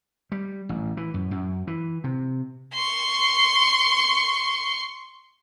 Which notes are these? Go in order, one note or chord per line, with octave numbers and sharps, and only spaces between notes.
G3
A1
E3
F#2
F#2
E3
C3
C6 C#6